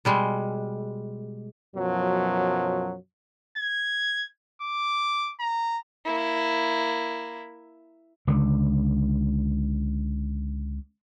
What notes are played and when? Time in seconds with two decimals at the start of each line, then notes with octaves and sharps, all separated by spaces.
0.05 B2 G3 G#3
1.76 F#2 B2 F3 F#3
3.58 G#6
4.62 D6
5.40 A#5
6.05 A#3 E4
8.27 C#2 D3